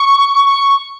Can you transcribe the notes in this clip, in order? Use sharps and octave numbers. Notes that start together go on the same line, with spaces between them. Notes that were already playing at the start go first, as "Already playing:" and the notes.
Already playing: C#6
C#6